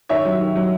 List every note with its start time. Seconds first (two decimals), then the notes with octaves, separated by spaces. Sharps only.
0.09 D#3 C#5 E5
0.25 F#3
0.41 D#3
0.56 F#3